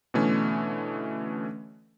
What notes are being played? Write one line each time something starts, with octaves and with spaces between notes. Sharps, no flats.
B2 D3 E3 A3 C#4